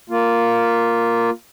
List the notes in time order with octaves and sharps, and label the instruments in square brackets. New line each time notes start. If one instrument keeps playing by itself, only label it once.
[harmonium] A#3 F4